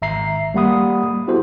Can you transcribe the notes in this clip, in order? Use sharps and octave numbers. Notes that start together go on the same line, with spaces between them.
G#1 E5 A#5 C7
G3 A#3 G4 F#5 B5 D#6
B3 E4 F#4 G4 A4 C5